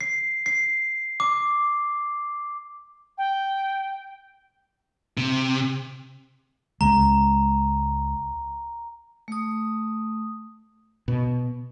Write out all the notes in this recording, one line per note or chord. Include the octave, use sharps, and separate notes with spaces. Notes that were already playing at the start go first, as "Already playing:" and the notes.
C7
C7
D6
G5
C3
C#2 C#3 G#3 A#5
A3 D#6
B2